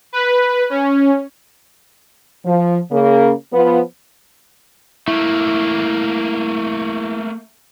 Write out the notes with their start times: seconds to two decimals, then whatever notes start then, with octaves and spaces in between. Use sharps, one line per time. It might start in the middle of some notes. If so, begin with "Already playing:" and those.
0.13 B4
0.70 C#4
2.45 F3
2.92 C#3 A#3
3.52 F3 B3
5.08 A3 A#3 E4